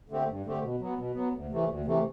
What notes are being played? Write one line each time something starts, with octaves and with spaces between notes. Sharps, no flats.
D3 A3 C4 G4
G2
D3 A3 C4 G4
B2
F#3 B3
B2
F#3 B3
D2
C3 E3 A3
D2
C3 E3 A3